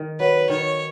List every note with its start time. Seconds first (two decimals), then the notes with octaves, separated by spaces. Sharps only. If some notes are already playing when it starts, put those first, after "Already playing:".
Already playing: D#3
0.20 F#3 B4
0.50 D#3 C#5